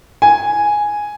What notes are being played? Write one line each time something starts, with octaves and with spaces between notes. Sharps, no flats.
G#5